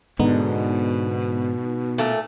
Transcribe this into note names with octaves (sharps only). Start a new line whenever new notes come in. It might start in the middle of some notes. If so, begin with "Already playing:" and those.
G#2 B2 D3 B3 D#4
A#2 A3